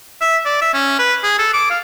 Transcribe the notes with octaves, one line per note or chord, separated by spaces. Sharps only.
E5
D5
E5
C#4
B4
G#4
A4
D6
F5